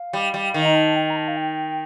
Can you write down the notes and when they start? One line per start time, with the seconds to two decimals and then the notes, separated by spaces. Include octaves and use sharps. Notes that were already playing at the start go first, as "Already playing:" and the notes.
Already playing: F5
0.13 G3
0.34 G3
0.54 D#3
0.65 A#5
0.75 A5
0.96 G5
1.10 A#5
1.16 A5
1.28 F5
1.37 G5